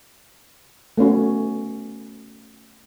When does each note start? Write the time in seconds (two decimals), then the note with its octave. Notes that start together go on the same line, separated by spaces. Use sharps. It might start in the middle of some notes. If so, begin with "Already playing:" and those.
0.98 A3 B3 C#4 F#4